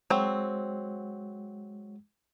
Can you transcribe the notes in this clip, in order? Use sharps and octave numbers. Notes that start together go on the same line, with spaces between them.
F#3 G#3 C4